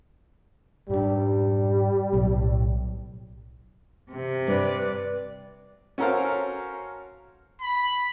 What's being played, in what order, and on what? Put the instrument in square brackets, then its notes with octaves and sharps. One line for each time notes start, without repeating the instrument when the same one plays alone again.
[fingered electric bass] G#2 D4 [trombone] G3
[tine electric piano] B1 [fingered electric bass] A2
[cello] C3
[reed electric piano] G2 [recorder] B4 [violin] D5
[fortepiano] C#4 F#4 A4 A#4 C5 F5
[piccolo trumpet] B5